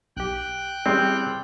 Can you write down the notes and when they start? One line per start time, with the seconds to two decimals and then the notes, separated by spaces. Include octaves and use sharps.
0.16 B1 G4 G5 F#6
0.86 G3 C4 C#4 E4 G#4